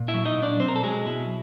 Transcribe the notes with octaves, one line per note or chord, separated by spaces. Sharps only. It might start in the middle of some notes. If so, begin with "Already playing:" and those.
Already playing: A#2
E4 E5
F#3
D#4 D#5
A#2
D4 D5
B2 C4 C5
A#4
A4
F#3 G#3 G#4
B2 E4